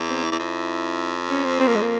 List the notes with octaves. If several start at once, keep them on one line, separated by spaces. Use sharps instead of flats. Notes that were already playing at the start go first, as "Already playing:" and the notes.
Already playing: E2
C4
E4
E2
F2
C#4
C4
C4
A#3
G#3
A#3